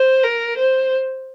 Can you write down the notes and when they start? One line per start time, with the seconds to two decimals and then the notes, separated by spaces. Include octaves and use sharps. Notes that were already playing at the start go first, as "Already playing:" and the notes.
Already playing: C5
0.23 A#4
0.58 C5